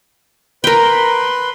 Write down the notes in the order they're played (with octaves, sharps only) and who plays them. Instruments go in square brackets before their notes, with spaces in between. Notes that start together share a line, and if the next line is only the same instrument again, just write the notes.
[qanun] A#4 G5 [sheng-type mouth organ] B4 B5 C6